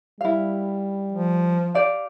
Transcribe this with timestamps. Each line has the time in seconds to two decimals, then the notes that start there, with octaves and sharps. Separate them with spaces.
0.21 G3 E4 F5
1.12 F3
1.75 G4 D5 F5